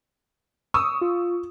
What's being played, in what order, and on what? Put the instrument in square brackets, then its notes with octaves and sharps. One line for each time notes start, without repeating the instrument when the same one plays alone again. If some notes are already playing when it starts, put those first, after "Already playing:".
[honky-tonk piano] C#6 D#6 E6
[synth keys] F4